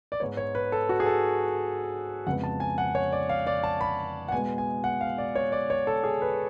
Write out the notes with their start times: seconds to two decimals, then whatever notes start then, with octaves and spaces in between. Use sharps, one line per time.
0.12 D5
0.20 G#2 G#3 B3 C#5
0.37 C#5
0.55 B4
0.72 A4
0.89 F#4
1.00 G#4
1.06 A4
2.27 F2 C#3 G#3 B3 F#5
2.44 A5
2.60 G#5
2.78 F#5
2.95 C#5
3.12 D5
3.29 F5
3.47 D5
3.64 A5
3.81 B5
4.28 F#5
4.32 B2 G#3 B3 G#5
4.58 G#5
4.84 F#5
5.01 F5
5.18 D5
5.35 C#5
5.52 D5
5.70 C#5
5.87 A4
6.04 G#4
6.22 B4